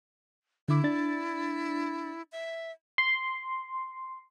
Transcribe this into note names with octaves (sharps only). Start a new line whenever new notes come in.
D3 E4 D6
D4 A6
E5
C6